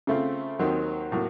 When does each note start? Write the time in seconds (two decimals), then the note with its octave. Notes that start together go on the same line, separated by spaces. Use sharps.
0.07 C#3 A3 C4 F4
0.59 D#2 D#3 F#3 C4
1.12 A2 F#3 A#3